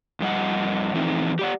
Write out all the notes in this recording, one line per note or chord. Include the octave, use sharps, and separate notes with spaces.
F2 G3 D#5 F#5
F2 E3 A3 C4 D#4
G4 D5 F#5